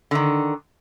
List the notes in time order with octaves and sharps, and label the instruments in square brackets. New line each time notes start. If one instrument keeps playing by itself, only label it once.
[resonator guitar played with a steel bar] D3 D#3